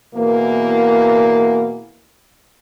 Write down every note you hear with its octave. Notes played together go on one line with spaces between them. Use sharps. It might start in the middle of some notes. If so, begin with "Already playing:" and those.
E2 B2 E3 A#3